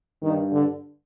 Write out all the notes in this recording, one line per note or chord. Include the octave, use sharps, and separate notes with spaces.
G2 D#3
D3